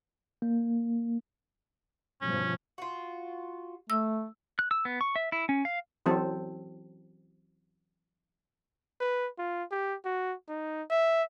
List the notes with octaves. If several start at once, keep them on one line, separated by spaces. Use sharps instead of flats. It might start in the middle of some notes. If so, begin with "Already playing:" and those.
A#3
G1 B2 F3 C#4
F4 F#4
A3 E6
F#6
E6
B3
C#6
E5
E4
C#4
F5
E3 F#3 C4 A4
B4
F4
G4
F#4
D#4
E5